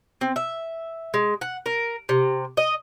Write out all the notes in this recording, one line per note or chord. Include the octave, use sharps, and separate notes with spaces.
C4
E5
G#3
F#5
A#4
C3
D#5